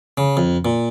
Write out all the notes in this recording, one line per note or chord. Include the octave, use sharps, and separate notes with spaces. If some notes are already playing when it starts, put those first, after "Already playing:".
C#3
F2
A#2